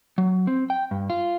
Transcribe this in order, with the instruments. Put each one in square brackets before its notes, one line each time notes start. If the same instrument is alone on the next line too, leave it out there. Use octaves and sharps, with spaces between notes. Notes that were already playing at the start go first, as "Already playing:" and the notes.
[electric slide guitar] F#3
C4
G5
G2
F4